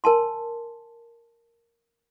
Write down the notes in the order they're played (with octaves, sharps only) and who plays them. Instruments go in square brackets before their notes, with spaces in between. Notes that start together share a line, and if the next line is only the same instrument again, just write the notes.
[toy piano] A#4 G#5 A5 C6